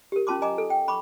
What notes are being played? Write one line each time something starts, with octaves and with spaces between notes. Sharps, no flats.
G4 A#4
C#4 F4 A5 C6 D6
D#5 G#5 A#5 D6
A4
G5
B5 C#6 D6